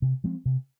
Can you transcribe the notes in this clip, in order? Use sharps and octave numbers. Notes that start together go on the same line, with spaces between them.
C3
F3 G#3 C4
C3